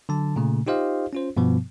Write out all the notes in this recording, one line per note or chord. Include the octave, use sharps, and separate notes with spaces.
D3 F#3 A5
A#2 C#3 A3
D#4 F4 G4 C5 D#5 F5
C#4 F4 C5
G2 B2 F3 B3